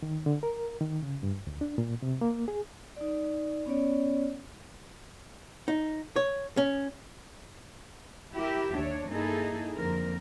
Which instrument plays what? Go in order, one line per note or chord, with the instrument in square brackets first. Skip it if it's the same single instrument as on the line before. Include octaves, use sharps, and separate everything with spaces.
[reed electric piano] D#3
D3
A#4
D#3
C#3
G2
D2
D4
A#2
C3
A#3
G#4
[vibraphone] D#4 D5
B3 C#4 C#5 D5
[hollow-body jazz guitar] D#4
C#5
C#4
[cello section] E4 G4 A#4 E5
D#2 D4 C#5
G2 A#3 D#4 E4 G#4 A4
F2 D3 A#3 C4 A#4